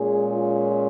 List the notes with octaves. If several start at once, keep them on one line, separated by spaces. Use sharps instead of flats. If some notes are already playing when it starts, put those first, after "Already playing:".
Already playing: A#2 G#3 C#4 G#4
F4